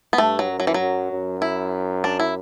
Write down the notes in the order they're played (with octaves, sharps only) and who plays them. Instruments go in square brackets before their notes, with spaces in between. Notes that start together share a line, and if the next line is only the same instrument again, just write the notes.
[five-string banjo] B3
[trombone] G2 [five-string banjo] A3
[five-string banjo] F#3
[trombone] F#2
[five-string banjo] F#3
E3
F#3
[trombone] F#2
F#2
[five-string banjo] E4
D4
E4